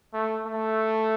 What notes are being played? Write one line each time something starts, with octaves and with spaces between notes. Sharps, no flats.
A3
A3